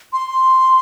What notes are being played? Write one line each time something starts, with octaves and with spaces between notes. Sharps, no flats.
C6